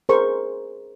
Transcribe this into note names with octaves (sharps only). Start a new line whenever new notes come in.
G#4 A#4 C5 C#6